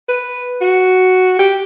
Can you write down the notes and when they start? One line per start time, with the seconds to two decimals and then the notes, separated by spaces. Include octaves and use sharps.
0.09 B4
0.61 F#4
1.39 G4